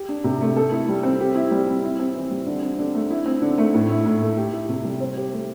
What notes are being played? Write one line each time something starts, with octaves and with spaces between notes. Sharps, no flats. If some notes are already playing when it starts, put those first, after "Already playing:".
Already playing: G4
D4
C3
A3
A4
E4
G3
C4
G4
E4
G3
C4
E4
C4
E3
G3
D3
C4
D3
A3
E4
C4
D3
A3
A2
E4
A2
A3
G4
E4
C3
G3
C5
G4
A3